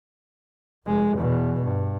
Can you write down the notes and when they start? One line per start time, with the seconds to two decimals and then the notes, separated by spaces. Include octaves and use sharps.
0.86 F1 G#3
1.16 E2 B2
1.63 G2